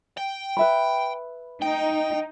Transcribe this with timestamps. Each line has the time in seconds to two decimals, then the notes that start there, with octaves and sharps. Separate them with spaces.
0.17 G5
0.57 B4 E5 B5
1.62 D#4 G5